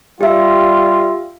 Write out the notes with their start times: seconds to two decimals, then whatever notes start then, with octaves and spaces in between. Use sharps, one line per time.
0.21 G3 F4 G4 E5